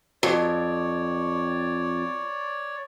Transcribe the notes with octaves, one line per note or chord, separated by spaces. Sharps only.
F2 C#5 D5